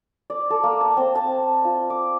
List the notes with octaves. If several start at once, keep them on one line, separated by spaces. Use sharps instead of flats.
D5
A4
A#3
A5
C4
A5
F4
D6